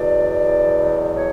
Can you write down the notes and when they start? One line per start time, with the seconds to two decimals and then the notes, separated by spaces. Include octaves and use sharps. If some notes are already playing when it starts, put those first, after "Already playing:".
Already playing: E2 B2 F#3 D5
1.14 C#5